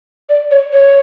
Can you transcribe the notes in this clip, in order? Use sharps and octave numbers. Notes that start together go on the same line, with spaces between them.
D5
C#5
C#5